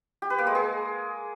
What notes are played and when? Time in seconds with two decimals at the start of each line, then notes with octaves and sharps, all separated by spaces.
0.22 G4
0.30 B4
0.38 A#3
0.47 G#3
0.55 G#4